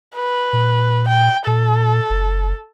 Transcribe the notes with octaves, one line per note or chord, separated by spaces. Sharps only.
B4
A#2
G5
A#2 A4
F#1